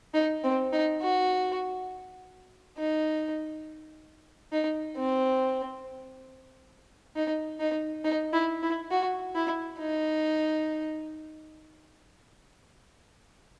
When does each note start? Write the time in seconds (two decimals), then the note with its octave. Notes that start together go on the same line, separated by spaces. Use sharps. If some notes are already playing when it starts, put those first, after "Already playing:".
0.14 D#4
0.44 C4
0.72 D#4
1.01 F#4
2.78 D#4
4.52 D#4
4.97 C4
7.16 D#4
7.60 D#4
8.04 D#4
8.33 E4
8.63 E4
8.91 F#4
9.35 E4
9.79 D#4